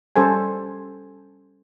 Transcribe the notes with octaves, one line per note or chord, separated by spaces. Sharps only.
G3 C#4 A4 C5 G#5